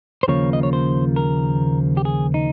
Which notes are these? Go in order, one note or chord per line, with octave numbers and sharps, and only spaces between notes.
C5
D#2 C#3 F3 A#3 C#5
D#5
C#5
C5
A#4
G4
G#4
D#4